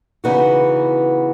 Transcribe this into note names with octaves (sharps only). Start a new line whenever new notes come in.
C#3 E3 B3 D#4 F#4